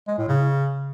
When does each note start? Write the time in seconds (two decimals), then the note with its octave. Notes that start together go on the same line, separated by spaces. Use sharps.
0.08 G#3
0.18 A2
0.28 C#3